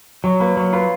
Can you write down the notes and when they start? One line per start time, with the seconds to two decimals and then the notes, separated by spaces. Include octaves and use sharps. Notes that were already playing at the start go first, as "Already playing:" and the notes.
0.24 F#3 C#5 C#6
0.40 A#3 B4 B5
0.57 F#3 C#5 C#6
0.73 F4 B4 B5